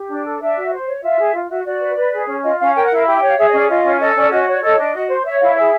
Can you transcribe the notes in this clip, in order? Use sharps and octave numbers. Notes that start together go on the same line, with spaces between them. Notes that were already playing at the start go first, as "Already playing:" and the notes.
Already playing: G4
D4
A4
D4 E5
F#4
C5
C#5
F4 E5
G#4
F4
F#4 E5
F#4 D5
B4
B4
G#4
C#4
F4 D#5
C#4 F5
A#4 G5
F#5
E4
F5
G4 E5
G5
C#5 F5
G#4 E5
D#5
C#4
D5
F4 D#5
C#4
A4 D#5
C#4 D5
F#4 D#5
D#5
C#5
D5
A4 D#5
D4
F#4
C5
C#5 E5
E4 F5
G#4 E5